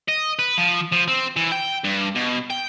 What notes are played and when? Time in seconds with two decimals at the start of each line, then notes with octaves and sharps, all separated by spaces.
0.08 D#5
0.39 B4
0.58 F3
0.92 F3
1.08 C4
1.36 E3
1.52 G5
1.84 G2
2.16 B2
2.50 G5